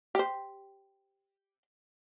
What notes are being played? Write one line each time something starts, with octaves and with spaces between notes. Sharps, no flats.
G4 C5